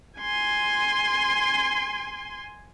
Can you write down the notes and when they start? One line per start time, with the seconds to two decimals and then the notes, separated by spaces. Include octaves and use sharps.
0.21 G#5 C6